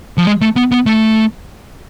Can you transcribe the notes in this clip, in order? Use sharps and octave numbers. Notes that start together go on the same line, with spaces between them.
F3
G#3
A3
B3
B3
A3